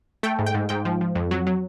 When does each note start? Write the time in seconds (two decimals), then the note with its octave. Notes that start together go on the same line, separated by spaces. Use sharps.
0.23 A3 G5
0.39 G#2
0.46 G5
0.54 G#2
0.69 G#2 G5
0.85 F3
1.01 F3
1.15 F2
1.31 F#3
1.47 F#3